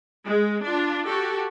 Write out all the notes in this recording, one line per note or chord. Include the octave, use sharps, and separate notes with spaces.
G#3
D4 F4
F#4 G4 A4